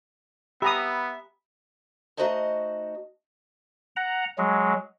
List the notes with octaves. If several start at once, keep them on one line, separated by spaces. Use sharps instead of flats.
B3 G4 E5 A#5 B5 D#6
A3 D#4 F#4 C5 D#5 A5
F#5 A#5
F#3 G#3